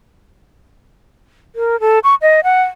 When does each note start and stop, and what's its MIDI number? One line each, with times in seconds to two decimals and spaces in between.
1.56 1.79 70
1.80 1.99 69
2.04 2.15 85
2.22 2.40 75
2.44 2.63 78